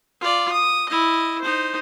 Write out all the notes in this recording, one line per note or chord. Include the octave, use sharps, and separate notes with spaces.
F4 D5
D#6
E4 D#5
D#4 C5